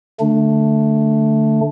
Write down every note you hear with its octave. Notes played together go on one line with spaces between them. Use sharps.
D3 A3 D4